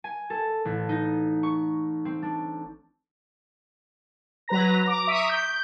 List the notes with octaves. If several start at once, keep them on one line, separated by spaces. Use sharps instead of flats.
G#5
A4
A1
D#4
C#6
C4
D4
F#3 B4 A#5 A#6
A#5 D6
E5 A#5 C#6 D#6 B6 D7
G6